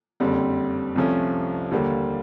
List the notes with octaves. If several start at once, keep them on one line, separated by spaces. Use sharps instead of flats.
F#1 F2 D3 G3 C4
C2 C3 F3 A3 C#4
D#2 D3 G3 A#3